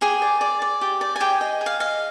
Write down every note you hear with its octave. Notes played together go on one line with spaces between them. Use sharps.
G4 G#4 G#5
D5
D5
D5
G4
D5
G#5
G4 G#4 G5
D#5
G#4
F5
D#5 F5